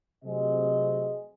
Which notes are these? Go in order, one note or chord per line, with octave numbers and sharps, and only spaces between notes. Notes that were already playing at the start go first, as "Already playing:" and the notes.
C3 F#3 A3 C4 G#4 D#5